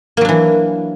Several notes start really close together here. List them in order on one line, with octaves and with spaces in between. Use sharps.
A#3 F#3 D4 E3